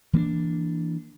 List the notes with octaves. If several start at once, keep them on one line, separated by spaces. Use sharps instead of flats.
E3 A#3 C#4 D4